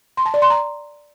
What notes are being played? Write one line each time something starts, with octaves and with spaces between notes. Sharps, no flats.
C6
A5
D5
C6
A#5